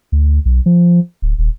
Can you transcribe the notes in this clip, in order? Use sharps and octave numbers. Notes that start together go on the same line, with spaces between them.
D2
B1
F3
D1
D#1